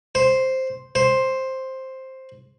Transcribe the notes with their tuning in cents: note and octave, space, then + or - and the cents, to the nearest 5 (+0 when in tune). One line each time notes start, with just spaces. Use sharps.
C5 +0
C5 +5